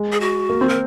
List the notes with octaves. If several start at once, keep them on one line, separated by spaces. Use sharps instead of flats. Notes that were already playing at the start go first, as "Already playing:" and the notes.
Already playing: G#3
G#4
F#4
A#3
C4
A#4